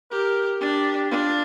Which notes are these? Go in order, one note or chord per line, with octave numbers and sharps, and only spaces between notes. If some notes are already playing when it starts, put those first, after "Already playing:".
G4 A#4
D4 G4
D4 F4